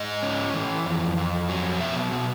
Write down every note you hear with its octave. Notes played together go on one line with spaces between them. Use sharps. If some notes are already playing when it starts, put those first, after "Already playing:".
Already playing: G#2 D#5
C#4
E3
F2
F2
F#3
B2 E5
B2